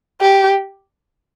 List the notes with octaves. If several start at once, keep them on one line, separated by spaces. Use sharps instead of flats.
G4